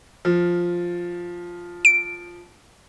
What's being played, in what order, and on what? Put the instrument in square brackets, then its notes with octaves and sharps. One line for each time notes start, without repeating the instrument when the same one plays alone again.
[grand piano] F3
[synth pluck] D7